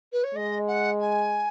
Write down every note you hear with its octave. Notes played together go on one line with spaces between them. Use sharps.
B4
C#5
G#3 D#5
F#5
G#5